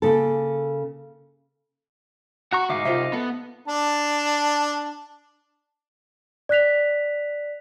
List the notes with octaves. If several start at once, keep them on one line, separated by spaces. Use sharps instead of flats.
C#3 A#3 A4
F#4 F#5 A#5 C#6
D2 G#2 D#4 E5 F5 D6
C2 F4 C5 E5
B3 A4
D4 A5
D5 F#6 B6 F7